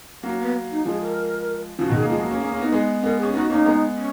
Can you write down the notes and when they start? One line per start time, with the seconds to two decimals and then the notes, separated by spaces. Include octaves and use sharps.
0.23 F#3 A#3 C#4
0.39 B3
0.70 D#4
0.85 F3 G#3 G#4
1.01 A#4
1.79 C#3 F3 F#4
1.89 B2 D#3
1.94 G#4
2.02 A#3
2.10 F3 G#3 G#4
2.20 F#3 A#3
2.31 A#3 C#4
2.41 A#3 C#4
2.51 A#3 C#4
2.61 B3 D#4
2.72 G#3 B3
3.03 G#3 B3 A#4
3.18 C#4 G#4
3.34 B3 D#4 F#4
3.50 A#3 C#4 D#4
3.65 G#3 B3
3.96 C#4